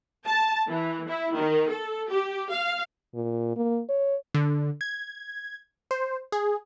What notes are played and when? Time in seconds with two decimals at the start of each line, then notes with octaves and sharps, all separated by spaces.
0.26 A5
0.68 E3
1.08 E4
1.36 D#3
1.70 A4
2.09 G4
2.51 F5
3.15 A#2
3.57 A#3
3.89 C#5
4.34 D3
4.81 G#6
5.91 C5
6.32 G#4